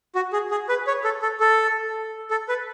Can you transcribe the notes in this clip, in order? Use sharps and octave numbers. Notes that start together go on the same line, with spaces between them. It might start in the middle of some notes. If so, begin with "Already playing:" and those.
F#4
G#4
G#4
B4
C#5
A4
A4
A4
A4
B4